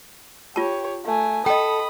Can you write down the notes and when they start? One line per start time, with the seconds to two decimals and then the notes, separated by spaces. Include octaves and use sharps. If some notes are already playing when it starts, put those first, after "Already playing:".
0.56 F4 G4 C#5 A5
1.06 A3 G#5
1.46 A4 D#5 G5 B5 D#6